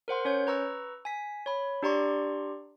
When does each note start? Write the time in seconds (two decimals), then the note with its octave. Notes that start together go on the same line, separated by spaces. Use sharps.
0.08 A#4 C5 F#5 C6
0.25 C#4 C#5 G6
0.47 B4 A#5 C#6 E6
1.05 G#5 B6
1.46 C#5 B5
1.83 D4 G4 D5 A#5 C6 C#6